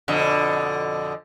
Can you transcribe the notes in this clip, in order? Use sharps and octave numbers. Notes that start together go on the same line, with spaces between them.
F2 B2 D3